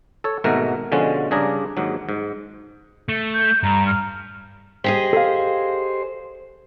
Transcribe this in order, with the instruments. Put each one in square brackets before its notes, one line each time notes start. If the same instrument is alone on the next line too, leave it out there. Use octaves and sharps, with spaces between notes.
[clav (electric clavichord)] A4 C#5
G#1 G#2 B2 A3 A#4
B2 D3 F3 G#3 C#4
G2 C#3 D4 G#4 D5 A#5
D#2 G#2 F#3
G#2
[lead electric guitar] A3
[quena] G6
[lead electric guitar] G2 [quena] A#5
[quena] F6
[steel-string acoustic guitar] G4 G#4 D#5 [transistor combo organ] C5
[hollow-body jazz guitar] A4 F5